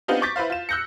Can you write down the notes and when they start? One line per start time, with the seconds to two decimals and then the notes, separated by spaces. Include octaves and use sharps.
0.08 B3 C4 D4 D#4 F4 G4
0.22 C#6 D6 G6 A6 B6
0.36 E4 B4 C5 F5
0.50 F4 E7
0.69 E6 F#6 G6 A#6 C#7